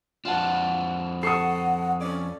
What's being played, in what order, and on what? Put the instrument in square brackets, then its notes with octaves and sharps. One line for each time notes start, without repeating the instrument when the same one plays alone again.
[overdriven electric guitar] F2 D4 [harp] F4 F#5 A5
[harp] A4 C#6 [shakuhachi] F#5 [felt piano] D#6 C7
[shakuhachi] C#4 [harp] D5